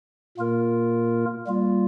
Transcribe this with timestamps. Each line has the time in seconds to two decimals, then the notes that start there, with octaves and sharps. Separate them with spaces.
0.37 A#2 A#3 F4 A#4
1.47 G3 A#3 F4